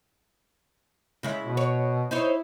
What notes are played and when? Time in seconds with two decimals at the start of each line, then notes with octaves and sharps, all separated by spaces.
1.23 C#3 G#3 E4
1.44 B2
1.57 C#5
2.11 D#4 E4 C5 C#5